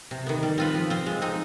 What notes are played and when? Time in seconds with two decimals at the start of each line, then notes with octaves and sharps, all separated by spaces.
0.11 C3
0.26 D#3 B3
0.43 G3
0.58 C4 F4 B4
0.74 F3
0.90 C4 F4 C5
1.06 G#3
1.22 C4 D#4